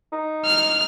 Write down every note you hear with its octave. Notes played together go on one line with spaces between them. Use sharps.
D#4
F6